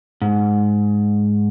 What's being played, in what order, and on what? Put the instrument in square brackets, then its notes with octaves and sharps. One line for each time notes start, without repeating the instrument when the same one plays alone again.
[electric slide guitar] G#2